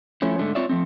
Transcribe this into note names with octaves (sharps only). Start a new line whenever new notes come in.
F3 A3 C#4 E4
G#2 D3 A3
C4 F4 C#5 D5 E5
F3 G#3 A3 C4